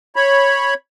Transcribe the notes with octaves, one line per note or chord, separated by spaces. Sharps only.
C#5 B5